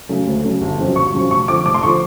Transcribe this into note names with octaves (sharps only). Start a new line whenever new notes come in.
C#3 F#3 A3
D2
C#3 F#3 A3
G1
F2 C#3 F#3
G1 C#6
F2 C#3 F#3
F1 C#6
F2 D3 F3 D6
F1 D6
C6
D3 F3 C#6